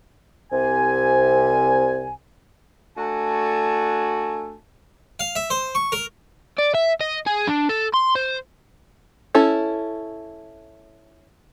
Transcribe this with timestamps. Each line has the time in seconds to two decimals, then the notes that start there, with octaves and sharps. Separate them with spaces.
0.52 C2 C3 G#5
2.97 A3 D4 F#4 G#5 A5
5.20 F5
5.36 E5
5.50 C5
5.75 C#6
5.92 A#4
6.58 D5
6.74 E5
7.01 D#5
7.27 G#4
7.48 D4
7.69 A4
7.94 C6
8.16 C5
9.35 C#4 E4 A4